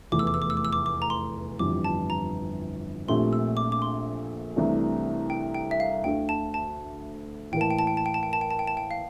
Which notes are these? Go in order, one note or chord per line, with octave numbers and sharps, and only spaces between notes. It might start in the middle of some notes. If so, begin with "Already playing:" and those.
F1 E2 E3 A3 D6
E6
D6
E6
D6
E6
D6
E6
D6
D6
A#5
C6
G1 F2 E3 G3 D6
A5
A#5
A#1 A#2 A3 C4 G4 C6
E6
D6
D6
C6
C2 C3 E3 A3 D4
G5
G5
E5
F5
D2 D3 A3 G5
A5
A5
A2 E3 A#3 G5
A5
G5
A5
G5
A5
G5
A5
G5
A5
G5
A5
G5
A5
G5
F5